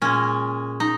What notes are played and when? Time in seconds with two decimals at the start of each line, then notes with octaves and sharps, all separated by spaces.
0.02 A#2 G#3 C#4
0.80 D#4